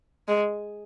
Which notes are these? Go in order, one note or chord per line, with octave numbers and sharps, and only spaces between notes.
G#3